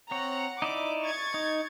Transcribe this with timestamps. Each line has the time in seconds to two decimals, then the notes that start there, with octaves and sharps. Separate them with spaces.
0.11 C4 C#5 F#5 A#5
0.62 D#4 E4 D5 D6
1.03 C#6 G#6 A6
1.34 D#4